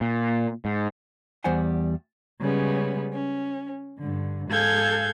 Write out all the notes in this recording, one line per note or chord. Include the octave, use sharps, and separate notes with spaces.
A#2
G#2
E2 G3 C5 F#5 G#5
C#3 G3 G#3 B3 C#4
C#4
G2 D3
G#2 G#4 A4 F5 G6 G#6